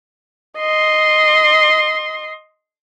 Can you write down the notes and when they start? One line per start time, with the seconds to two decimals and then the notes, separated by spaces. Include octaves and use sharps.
0.59 D#5 C6